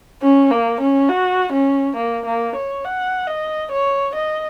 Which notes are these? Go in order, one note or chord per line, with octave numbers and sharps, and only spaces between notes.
C#4
A#3
C#4
F#4
C#4
A#3
A#3
C#5
F#5
D#5
C#5
D#5